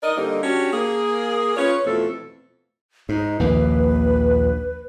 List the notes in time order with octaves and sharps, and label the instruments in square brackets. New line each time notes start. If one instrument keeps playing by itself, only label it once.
[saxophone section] D#4 A#4 D5 D#5
D3 G3 A#3 C4 D#4
C#4 D4 F#4 G4
A#3 G#4
C#4 F4 B4 C#5
F2 B2 E3 F3 A3 A4
[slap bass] G#2 [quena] D#4
[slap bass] A#1 D#2 A#3 [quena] B4